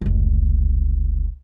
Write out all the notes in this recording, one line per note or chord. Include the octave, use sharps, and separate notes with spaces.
F1 C#2